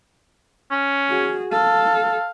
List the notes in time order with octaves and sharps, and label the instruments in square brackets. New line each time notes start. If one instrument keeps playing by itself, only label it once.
[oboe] C#4
[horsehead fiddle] F#4 G#4
[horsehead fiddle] A4 [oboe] F5